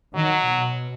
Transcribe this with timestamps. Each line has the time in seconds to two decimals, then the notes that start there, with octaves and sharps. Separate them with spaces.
0.14 D#3 F#3
0.48 B2